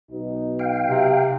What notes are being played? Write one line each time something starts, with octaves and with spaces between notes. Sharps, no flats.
B1 B2 D#4
F5 G5
C3